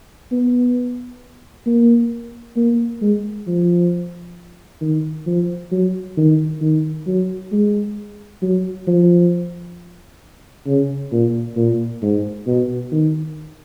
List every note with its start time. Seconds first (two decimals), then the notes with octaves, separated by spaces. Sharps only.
0.32 B3
1.66 A#3
2.56 A#3
3.02 G#3
3.47 F3
4.81 D#3
5.27 F3
5.71 F#3
6.17 D#3
6.61 D#3
7.07 F#3
7.52 G#3
8.42 F#3
8.87 F3
10.67 C#3
11.12 A#2
11.57 A#2
12.02 G#2
12.47 B2
12.92 D#3